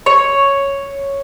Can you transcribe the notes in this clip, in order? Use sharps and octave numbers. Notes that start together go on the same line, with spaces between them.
C#5